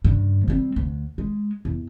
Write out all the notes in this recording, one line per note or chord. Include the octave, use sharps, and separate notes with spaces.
G2 C#3
G3 C4
D2
G#3
E2